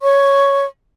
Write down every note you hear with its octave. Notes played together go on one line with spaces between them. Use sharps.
C#5 C#6